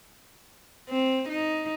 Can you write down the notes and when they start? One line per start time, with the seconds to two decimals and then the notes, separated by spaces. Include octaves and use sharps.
0.89 C4
1.29 D#4